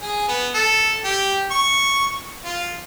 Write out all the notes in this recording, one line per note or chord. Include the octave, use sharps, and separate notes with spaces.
G#4
B3
A4
G4
C#6
F4